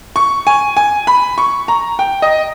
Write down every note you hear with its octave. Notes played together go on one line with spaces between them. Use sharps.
C#6
G#5
G#5
B5
C#6
A#5
G5
D#5